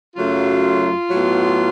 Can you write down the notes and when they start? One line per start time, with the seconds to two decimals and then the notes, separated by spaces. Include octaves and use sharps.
0.16 F#2 C#3 F#3 A3 F4
1.09 A2 F#3 B3